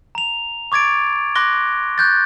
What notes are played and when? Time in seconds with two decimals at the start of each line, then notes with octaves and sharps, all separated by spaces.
0.15 A#5 F7
0.72 C#6 D6 G#6 A6 D7
1.35 C6 D6 F#6 A#6 G7
1.98 C#6 F#6 G6 A6